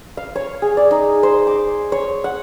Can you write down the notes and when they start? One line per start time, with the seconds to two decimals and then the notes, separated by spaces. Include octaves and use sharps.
0.17 F5
0.36 C#5
0.62 G#4
0.77 D5
0.91 D#4
1.23 C5
1.47 D6
1.92 C#5
2.24 F#5